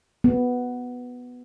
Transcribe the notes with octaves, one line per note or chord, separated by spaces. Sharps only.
B3